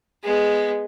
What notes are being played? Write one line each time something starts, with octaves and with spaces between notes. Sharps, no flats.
G#3 B3